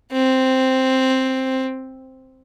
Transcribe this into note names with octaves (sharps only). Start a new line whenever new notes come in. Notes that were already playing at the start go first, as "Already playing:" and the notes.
C4